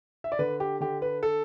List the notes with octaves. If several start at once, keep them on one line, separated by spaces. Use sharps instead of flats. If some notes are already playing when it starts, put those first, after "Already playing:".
E5
D5
D3 B4
G4
D3 G4
B4
A4